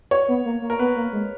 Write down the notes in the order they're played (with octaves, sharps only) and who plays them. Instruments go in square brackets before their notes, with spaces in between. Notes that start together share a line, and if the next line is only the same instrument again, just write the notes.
[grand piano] C#5
[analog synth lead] B3
A#3
A#3
[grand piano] A#4
[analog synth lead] B3 [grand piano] B4
[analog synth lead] A#3
G#3